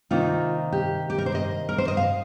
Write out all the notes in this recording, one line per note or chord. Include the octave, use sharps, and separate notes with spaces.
C3 D#3 A#3 D#4 F4
G4
G4
A#4
C5
D#5
A#4
C5
D#5
F5